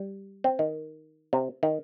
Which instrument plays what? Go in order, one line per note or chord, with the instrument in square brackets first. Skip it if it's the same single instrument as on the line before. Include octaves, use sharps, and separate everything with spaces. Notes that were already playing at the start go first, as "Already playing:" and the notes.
Already playing: [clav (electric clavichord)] G3
C4
D#3
C3
D#3